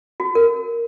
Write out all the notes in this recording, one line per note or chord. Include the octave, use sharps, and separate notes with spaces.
F#4
A#4